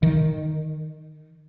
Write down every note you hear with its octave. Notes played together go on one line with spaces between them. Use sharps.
D#3